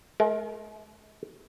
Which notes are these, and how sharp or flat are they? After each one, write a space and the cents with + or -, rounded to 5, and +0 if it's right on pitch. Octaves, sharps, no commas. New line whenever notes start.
G#3 +45 A#4 +0